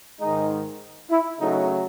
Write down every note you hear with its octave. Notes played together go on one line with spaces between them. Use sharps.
G#2 D#3 G#3 D#4
E4
C#3 F#3 A3 D#4